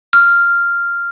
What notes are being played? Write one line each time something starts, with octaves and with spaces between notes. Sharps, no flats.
F6